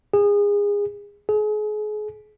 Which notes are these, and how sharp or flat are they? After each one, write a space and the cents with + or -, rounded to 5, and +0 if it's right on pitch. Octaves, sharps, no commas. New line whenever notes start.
G#4 -25
G#4 +35